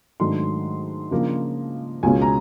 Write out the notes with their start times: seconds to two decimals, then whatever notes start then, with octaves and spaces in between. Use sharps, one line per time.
0.20 G#2 D#3 F#3 A3 D4 C6
1.11 C#3 F3 A#3 D4
2.03 C#2 B2 G#3 C#4 G#5
2.22 A#5